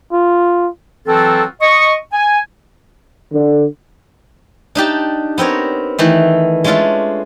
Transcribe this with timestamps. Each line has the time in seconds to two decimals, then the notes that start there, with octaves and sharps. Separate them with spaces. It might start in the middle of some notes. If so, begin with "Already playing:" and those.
0.12 F4
1.07 E3 F#3 C4 F4 F#4 A4
1.61 D#5 C#6
2.12 G#5
3.33 D3
4.75 D4 D#4 G4 A5
5.38 B3 C4 A#4 C#5
5.99 D#3 E3 A3
6.64 G#3 A3 C#4 D4 F4 A4